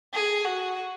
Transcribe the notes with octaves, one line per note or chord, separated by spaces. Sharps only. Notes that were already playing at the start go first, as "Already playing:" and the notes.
G#4
F#4